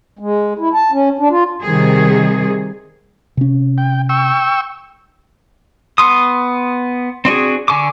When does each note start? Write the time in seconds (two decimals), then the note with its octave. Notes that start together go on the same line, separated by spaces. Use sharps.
0.19 G#3
0.59 E4
0.74 A5
0.92 C#4
1.19 D4
1.31 F4
1.62 C3 D#3 G3 G#4
3.37 C3 C#4
3.78 G5
4.09 G5 C#6 E6
5.98 B3 C6 D#6
7.25 C4 D4 F#4 G#4
7.68 D3 G#5 C#6 D6